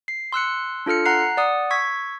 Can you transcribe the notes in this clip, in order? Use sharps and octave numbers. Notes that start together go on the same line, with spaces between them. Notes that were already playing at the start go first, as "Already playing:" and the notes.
C7
C6 E6 F#6 C#7
D4 F4 A4 F6 C#7
F#5 A#5 F#6 C7
D5 F#5 D#6
C#6 E6 G#6 B6